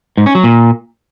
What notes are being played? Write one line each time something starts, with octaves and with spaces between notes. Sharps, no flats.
G#2
C#4
F#3
A#2